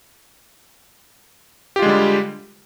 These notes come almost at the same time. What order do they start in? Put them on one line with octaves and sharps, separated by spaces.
G4 F4 G#3 D3 G3